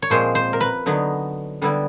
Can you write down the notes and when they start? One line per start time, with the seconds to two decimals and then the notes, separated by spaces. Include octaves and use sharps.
0.02 C#5
0.10 A#2 F3 G#3 C4 C5
0.35 C5
0.53 A#4
0.61 B4
0.86 D3 F#3 B3 D#4
1.62 D3 G3 B3 E4